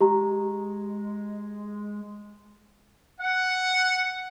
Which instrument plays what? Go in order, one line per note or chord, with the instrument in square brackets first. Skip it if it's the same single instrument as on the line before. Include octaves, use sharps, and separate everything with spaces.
[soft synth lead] G#3 [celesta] G4 A#5
[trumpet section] F#5